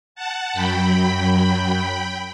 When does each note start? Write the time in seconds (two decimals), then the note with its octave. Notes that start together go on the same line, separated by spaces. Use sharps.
0.15 F#5 A5
0.53 F#2 F#3 G5 B5
1.32 G5 B5